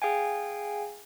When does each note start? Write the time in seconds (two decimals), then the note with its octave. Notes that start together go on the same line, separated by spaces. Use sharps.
0.02 G#4 F5 G5 G#5